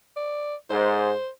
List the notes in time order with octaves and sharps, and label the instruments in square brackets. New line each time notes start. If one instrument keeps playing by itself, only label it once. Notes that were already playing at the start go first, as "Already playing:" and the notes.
[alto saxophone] D5
[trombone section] G#2 [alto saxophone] C5